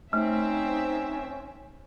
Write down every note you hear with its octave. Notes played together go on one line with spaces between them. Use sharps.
A3 C4 C#4 D#4 E5